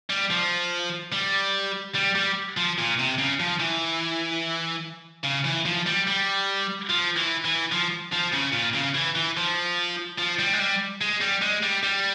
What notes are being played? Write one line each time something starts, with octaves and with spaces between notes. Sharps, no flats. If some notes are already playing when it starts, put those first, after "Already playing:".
G3
F3
G3
G3
G3
F3
A#2
C3
C#3
F3
E3
C#3
E3
F3
G3
G3
F3
E3
E3
F3
F3
C#3
A#2
C#3
E3
E3
F3
F3
G3
G#3
G3
G#3
G3
G#3
G3
G3